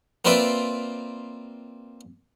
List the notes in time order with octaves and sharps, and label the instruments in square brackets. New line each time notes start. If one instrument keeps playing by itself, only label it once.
[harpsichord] A#3 C4 F4 B4 D5 E5